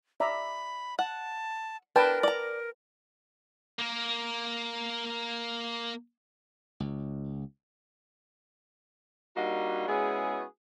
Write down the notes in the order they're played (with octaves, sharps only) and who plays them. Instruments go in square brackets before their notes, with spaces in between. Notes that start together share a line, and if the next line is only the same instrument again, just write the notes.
[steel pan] D5 E5 A#5 [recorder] B5
[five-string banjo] F#5 [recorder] A5
[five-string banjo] D4 [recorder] A#4 [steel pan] B4 G5 A5
[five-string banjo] D5 A#5
[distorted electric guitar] A#3 A#4
[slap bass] C#2
[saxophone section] G3 A#3 D4 D#4 F#4
G#3 B3 C#4 E4 F#4 G#4